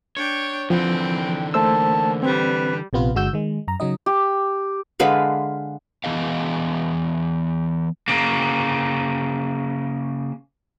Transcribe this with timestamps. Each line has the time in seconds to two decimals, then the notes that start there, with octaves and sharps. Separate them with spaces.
0.17 D4 C#5 G5
0.70 D3 E3 F3 C4 G5
1.54 A3 A#3 C5 A5 E6
2.23 G3 C4 B4
2.93 A#1 C3 B3 F4 B4
3.15 G1 D3 G#3 F#4 E6 G6
3.33 D#3 G#3
3.68 F#2 A#5
3.80 C#3 F#3 D#4 D#5
4.06 G4
5.00 D3 G#3 B4 F5
6.04 E3 B3 G#4 D#5 F5
8.08 C#3 A#3